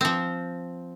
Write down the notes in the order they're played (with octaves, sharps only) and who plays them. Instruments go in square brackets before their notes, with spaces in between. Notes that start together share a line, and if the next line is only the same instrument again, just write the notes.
[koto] F3 C4